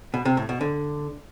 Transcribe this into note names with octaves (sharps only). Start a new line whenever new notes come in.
B2
C3
A2
B2
D3